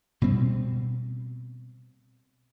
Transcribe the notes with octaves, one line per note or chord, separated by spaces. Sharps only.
B2 G3 C4